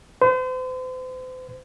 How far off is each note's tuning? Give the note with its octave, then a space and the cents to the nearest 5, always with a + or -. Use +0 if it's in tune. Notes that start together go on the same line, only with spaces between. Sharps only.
C5 -40